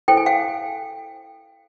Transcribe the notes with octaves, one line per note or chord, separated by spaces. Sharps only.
E4 A4 C5 G5
G#5
F5 G5